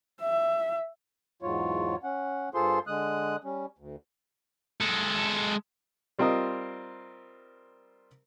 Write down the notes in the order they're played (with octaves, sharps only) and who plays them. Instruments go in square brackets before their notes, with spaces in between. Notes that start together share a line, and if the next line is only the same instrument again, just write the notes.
[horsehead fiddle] E5
[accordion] E2 G#2 F#3 F4 C#5
C#4 F#5
G2 F4 G#4 A4 C5 C6
D3 G#3 D#6 F#6
G3 C#4
D2
[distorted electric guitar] G#3 A4
[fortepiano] G3 C4 F4 A#4 D#5